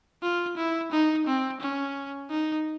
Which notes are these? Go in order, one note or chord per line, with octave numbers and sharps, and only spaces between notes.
F4
E4
D#4
C4
C#4
D#4